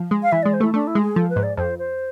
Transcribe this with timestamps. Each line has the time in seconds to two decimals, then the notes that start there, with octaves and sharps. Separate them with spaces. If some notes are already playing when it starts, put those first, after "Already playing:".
Already playing: F3
0.11 G#3
0.23 F5
0.32 E3 E5
0.43 G#3 D5
0.53 C5
0.60 A3 E4
0.74 A3 D4
0.87 E4
0.95 G#3
1.02 G#4
1.15 F3 A4
1.30 B4
1.36 G#2
1.43 D5
1.57 F2 C5
1.79 C5